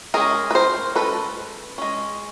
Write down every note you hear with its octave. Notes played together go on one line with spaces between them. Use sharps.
G#3 C#4 G#4 A#4
B4
A#4 C5
G#3 C#4 A4 B4
G#3 C#4